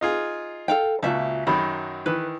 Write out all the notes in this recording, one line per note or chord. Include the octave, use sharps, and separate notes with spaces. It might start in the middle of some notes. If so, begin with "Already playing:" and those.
D#4 F4 G#4
A4 F5 G5
C#2 A#2 F#4 E5 A5
F#2 D#3 F#3 B5
D#3 E3 B4